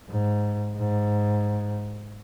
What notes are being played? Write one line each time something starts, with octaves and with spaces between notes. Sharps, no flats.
G#2
G#2